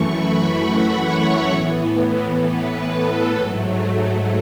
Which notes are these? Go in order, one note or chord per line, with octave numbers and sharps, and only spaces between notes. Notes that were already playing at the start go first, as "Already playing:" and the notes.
Already playing: F#2 E3 A3 C#6
B5
F#5
C#5
A2 E3 B3
B4
A4
G#2 F#3 A3